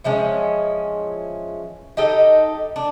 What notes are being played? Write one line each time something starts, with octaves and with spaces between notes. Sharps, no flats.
E3 F3 G#3 C#4
D#4 G4 A4 D#5
D4